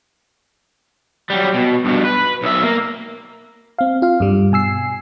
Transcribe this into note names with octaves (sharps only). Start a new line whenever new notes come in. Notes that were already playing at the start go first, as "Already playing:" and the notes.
F#3 G3
B2
G2 B2
B4
B1 E5
A#3
C4 F5
F4 F5
G2 G3
B2 G#5 E6 C7